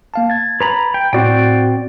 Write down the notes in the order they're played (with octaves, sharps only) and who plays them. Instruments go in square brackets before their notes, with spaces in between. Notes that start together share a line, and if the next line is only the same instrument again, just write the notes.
[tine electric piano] A#3 F5 A5
G#6 A6
[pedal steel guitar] B4 A#5 B5
G5
[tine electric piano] A2 F#4 [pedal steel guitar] C4 D5 G5